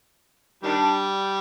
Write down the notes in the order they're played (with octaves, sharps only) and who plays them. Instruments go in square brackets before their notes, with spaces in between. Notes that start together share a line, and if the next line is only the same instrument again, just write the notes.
[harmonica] D#3 G3 [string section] D4